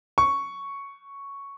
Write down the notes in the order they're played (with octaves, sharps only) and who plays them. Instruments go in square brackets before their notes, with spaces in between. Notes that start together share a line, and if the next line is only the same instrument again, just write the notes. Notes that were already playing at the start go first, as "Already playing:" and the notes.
[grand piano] C#6